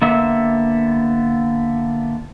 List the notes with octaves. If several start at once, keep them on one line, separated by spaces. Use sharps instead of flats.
D3 A#3 B3 E5